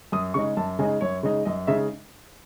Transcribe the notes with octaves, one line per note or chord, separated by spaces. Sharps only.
F#2 D#6
C#3 G#3 D#4 C#6
F#2 A5
C#3 G#3 D#4 G#5
F#2 C#5
C#3 G#3 D#4
F#2 D#5
C#3 G#3 D#4 E5